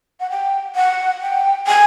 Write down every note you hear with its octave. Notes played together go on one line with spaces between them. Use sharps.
F#5
G5
F#5
G5
G#5